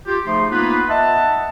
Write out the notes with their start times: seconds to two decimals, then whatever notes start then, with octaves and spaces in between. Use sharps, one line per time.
0.07 F4 G4
0.26 C#3 F3 A3 D#4 C6
0.52 A#3 B3 D#4 F4 B4
0.90 D#5 E5 F#5 A5